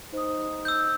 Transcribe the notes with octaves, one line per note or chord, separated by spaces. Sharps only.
D#4 C5 D#6
E6 G6